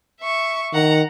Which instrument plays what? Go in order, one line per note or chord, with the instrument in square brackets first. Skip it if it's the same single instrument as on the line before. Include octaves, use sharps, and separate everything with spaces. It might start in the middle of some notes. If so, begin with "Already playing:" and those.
[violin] E5 C#6
[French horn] D#3 [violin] F#5 A#5